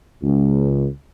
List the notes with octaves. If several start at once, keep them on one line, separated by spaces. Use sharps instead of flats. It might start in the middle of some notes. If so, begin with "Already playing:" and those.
C#2